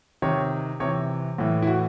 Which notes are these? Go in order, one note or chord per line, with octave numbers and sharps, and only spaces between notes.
C3 D#3 C#5
C3 E3 C#5
A2 E3
E4
F#4